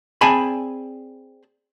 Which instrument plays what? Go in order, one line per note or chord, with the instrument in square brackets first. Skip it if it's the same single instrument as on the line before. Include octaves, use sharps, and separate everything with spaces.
[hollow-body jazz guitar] C4 G#4 D5 G#5 A5 B5